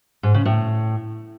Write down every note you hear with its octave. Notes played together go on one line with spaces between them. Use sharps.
G#2
C#3
A2